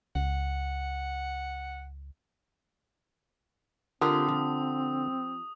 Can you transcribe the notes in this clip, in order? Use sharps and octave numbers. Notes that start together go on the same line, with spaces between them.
C#2 F#5
D3 C4 F4 G4 A#4 D#6
F3